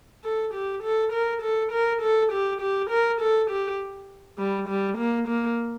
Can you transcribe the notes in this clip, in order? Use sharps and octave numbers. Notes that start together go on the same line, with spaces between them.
A4
G4
A4
A#4
A4
A#4
A4
G4
G4
A#4
A4
G4
G3
G3
A#3
A#3